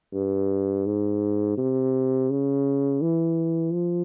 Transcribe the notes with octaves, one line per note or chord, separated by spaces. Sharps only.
G2
G#2
C3
C#3
E3
F3